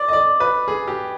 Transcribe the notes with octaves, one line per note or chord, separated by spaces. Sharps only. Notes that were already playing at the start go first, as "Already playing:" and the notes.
Already playing: D5
D#5
D5
B4
G#4
G4